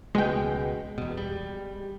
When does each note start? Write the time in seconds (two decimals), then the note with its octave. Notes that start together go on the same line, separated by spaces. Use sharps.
0.15 C#2 B2 G#3 G5
0.98 E2 B2
1.17 G3